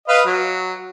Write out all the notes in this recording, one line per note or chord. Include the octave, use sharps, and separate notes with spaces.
B4 D#5 F5
F#3